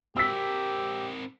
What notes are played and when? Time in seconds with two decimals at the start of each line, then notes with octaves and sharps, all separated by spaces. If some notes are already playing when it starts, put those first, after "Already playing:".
0.17 C4 G4 A#4 E6 B6